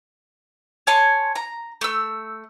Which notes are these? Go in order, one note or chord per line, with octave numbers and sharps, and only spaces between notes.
C#5 G#5 A5 C6
A#5
A3 E6